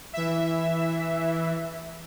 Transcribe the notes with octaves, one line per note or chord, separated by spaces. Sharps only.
E3 E5